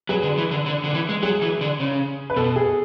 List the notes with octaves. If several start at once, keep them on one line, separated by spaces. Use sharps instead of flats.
F#3 G#4 B4
D3
E3
D3
D3
D3
E3
G#3
F#3 G#4
E3
D3
C#3
B4
B2 A4
G#4